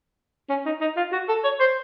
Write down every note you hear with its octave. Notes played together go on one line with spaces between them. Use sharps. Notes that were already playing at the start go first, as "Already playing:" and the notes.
C#4
D#4
D#4
F4
F#4
A4
C#5
C5